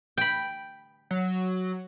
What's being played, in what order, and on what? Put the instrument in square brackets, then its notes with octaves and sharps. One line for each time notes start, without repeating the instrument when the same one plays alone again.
[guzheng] G5 B5
[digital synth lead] F#3